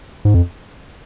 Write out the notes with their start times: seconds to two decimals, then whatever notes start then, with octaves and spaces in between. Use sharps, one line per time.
0.25 G#2
0.34 F2